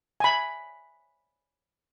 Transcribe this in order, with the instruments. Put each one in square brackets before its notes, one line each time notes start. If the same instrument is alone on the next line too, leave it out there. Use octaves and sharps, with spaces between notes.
[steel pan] G#5 B5